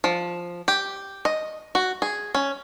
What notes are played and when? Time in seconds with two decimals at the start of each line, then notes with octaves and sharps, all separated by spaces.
0.04 F3
0.68 G4
1.25 D#5
1.75 F#4
2.02 G#4
2.35 C#4